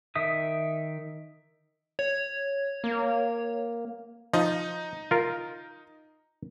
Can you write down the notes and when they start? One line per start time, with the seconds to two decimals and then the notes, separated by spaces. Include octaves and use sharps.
0.16 D#3 E5 D#6
1.99 C#5
2.84 A#3
4.33 F3 D#4 D#5
5.11 F4 A#4